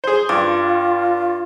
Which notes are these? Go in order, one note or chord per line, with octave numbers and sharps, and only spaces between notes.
G#4 C5
G2 F4 D6